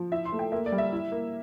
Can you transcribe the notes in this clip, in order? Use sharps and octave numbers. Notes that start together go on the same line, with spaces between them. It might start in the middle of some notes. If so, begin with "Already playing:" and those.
Already playing: F3
E4 E5
C6
A3
G5
A#3 E5
D5
G3
E5
E4
A#3